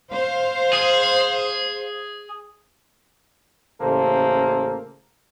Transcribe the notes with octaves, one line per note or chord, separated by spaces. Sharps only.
C5 F5
G#4
A1 C#3 A#3 A4 C5